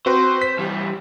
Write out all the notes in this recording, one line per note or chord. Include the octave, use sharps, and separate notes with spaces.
C4 F#4 B4 C5
B6
E3 G3